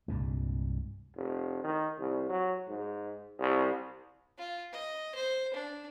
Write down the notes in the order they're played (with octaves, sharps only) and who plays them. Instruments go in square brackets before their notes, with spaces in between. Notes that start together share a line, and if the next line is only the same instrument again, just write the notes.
[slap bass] C2 G2 A#2 G#3
[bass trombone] F1
D#3
C2
F#3
G#2
C2
[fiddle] F4
D#5
C5
D4